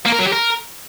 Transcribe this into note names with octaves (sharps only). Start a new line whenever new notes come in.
A#3
A#4
F#3
G4
A#4